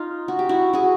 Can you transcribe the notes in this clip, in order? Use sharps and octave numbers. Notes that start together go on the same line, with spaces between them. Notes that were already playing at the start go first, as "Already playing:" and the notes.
Already playing: D#4 F4
F#4
G4
E4 F#4
F#4 G#4